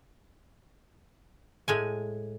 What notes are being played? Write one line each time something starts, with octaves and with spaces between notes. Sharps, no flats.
A2 G#3 G#5